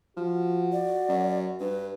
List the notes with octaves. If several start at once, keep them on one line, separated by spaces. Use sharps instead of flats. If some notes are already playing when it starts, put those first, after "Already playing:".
F3 F#4
D5
F#2
G2 B4